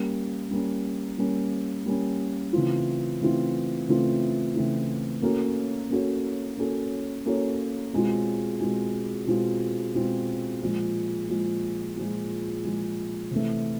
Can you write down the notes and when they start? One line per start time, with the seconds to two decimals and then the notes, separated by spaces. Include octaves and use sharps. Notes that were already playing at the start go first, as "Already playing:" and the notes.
Already playing: G3 A#3 C#4
0.51 G3 A#3 C#4
1.18 G3 A#3 C#4
1.86 G3 A#3 C#4
2.53 C#3 E3 A3 C4 F4
3.21 C#3 E3 A3 C4 F4
3.88 C#3 E3 A3 C4 F4
4.55 C#3 E3 A3 C4 F4
5.22 A#3 C#4 F#4 A4 C#5
5.90 A#3 C#4 F#4 A4 C#5
6.58 A#3 C#4 F#4 A4 C#5
7.26 A#3 C#4 F#4 A4 C#5
7.93 B2 G#3 C4 F4
8.60 B2 G#3 C4 F4
9.27 B2 G#3 C4 F4
9.94 B2 G#3 C4 F4
10.62 A#2 F3 G#3
11.29 A#2 F3 G#3
11.96 A#2 F3 G#3
12.65 A#2 F3 G#3
13.31 C3 E3 A3